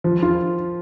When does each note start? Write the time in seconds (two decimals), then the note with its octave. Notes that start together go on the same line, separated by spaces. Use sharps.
0.04 F3
0.23 F4